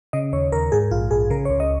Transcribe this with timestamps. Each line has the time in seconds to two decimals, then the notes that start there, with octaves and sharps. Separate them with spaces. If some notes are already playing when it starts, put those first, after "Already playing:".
0.13 C#3 D#5
0.33 D#2 C#5
0.52 D#2 A#4
0.72 G#2 G#4
0.91 A#1 F4
1.11 A#1 G#4
1.30 C#3 A#4
1.45 C#5
1.50 C#2
1.60 D#5